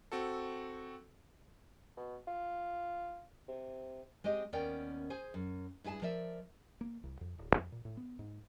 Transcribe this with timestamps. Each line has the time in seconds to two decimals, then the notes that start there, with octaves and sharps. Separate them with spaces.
0.12 C4 F#4 A4
1.97 B2
2.27 F4
3.48 C3
4.24 G#3 C4 G4 D#5
4.53 D#2 B3 C#4 A#4 D5 G5
5.10 G#4 C5 G#5
5.34 F#2
5.84 G2 E4 G#4 G#5 A5
6.02 F3 A#4 D5 E5
6.81 A#3
7.04 C2
7.21 F2
7.38 D1
7.55 F2
7.72 A#2
7.85 A2
7.97 B3
8.19 G#2